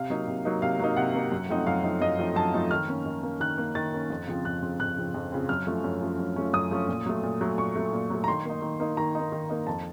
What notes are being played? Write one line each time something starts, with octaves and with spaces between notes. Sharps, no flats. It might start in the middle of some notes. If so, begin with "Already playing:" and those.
Already playing: C3 F5
F#3 A#3 D#4
C3
F#3 A#3 D#4
C3 F5
F#3 A#3 D#4
C3 F#5
F#3 A#3 D#4
F#2
F3 A3 C4 D#4
F#2 F5
F3 A3 C4 D#4
F#2 D#5
F3 A3 C4 D#4
F#2 A5
F3 A3 C4 D#4
D#3 F6
A#3 C#4
D#3
A#3 C#4
D#3 F#6
A#3 C#4
D#3 A6
A#3 C#4
F2
C#3 F3 C4
F2 F#6
C#3 F3 C4
F2 F#6
C#3 F3 C4
F2
C#3 F3 C4
F#2 F6
F3 A3 C#4
F#2
F3 A3 C#4
F#2
F3 A3 C#4
F#2 D#6
F3 A3 C#4
A#2
F#3 A3
A#2
F#3 A3
A#2 C#6
F#3 A3
A#2
F#3 A3
A#5
D#3 C6
A#3 D#4
D#3
A#3 D#4
D#3 A#5
A#3 D#4
D#3
A#3 D#4
F2 A5